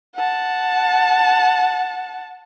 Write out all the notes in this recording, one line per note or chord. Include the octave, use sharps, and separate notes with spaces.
F#5 A5